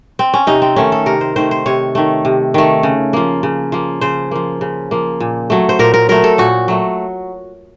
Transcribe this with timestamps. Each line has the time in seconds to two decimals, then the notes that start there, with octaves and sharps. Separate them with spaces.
0.19 C4
0.34 C#4
0.47 C3 D#4
0.62 C4
0.76 D#3 A3 C#4
0.92 A4
1.06 C3 A#4
1.21 C5
1.36 D#3 A3 C5
1.51 C5
1.66 C3 C#5
1.95 D#3 A3
2.25 C3
2.54 D#3 A3
2.83 C#3
3.13 F3 A#3
3.43 C#3
3.72 F3 A#3
4.01 C#3 C5
4.31 F3 A#3
4.61 C#3
4.91 F3 A#3
5.20 A#2
5.50 F#3 A3
5.69 C5
5.79 A#2 A#4
5.94 A#4
6.09 F#3 A3 A#4
6.24 A4
6.38 A#2 F#4
6.68 F#3 A3